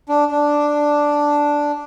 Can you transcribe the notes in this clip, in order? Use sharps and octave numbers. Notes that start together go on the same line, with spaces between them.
D4
D4